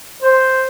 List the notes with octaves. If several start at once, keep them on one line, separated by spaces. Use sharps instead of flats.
C5